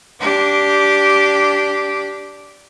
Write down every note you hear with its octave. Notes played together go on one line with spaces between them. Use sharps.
D4 G4